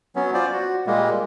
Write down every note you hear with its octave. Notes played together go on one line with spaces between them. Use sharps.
F#3 B3 C#4
F4 C5 D5
F#4
A#2 G3 G#3 A#3